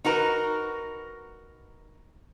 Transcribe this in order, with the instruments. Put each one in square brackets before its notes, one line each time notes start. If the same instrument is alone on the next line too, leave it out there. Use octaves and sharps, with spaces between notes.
[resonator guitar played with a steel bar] D#4 F#4 A#4 B4